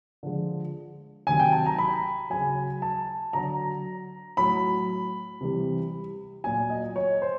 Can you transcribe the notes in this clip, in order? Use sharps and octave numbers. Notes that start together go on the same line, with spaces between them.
D3 F3 G#3
C3 D#3 F#3 G#5
G5
A5
A#5
B5
C#3 F#3 G#5
A5
D3 F#3 A#5
A2 F#3 B5
C3 E3 G3
A#2 F#3 G#5
D#5
C#5
C5